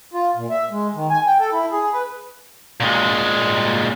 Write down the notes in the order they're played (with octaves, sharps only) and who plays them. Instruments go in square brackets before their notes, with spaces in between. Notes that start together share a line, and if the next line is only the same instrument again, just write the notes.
[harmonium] F4
A#2
E5
G#3
D#3
G#5
G5
A4
E4
G#4
B4
[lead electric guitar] A#2 G#3